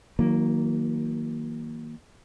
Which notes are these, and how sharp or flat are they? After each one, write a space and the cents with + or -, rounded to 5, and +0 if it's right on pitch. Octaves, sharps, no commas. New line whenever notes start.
D#3 +40 F#3 +0 A#3 +0